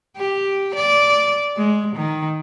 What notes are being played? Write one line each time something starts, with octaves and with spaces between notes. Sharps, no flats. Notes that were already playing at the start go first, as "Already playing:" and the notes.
G4
D5
G#3
D#3